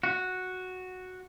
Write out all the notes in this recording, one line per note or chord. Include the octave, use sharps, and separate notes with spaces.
F#4